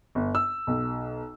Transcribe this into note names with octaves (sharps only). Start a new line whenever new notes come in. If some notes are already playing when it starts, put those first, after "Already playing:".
G1
E6
B1